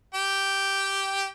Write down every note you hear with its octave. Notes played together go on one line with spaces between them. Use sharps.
G4 G5